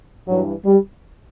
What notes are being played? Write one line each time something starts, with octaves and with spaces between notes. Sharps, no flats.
G2 E3 F#3
G3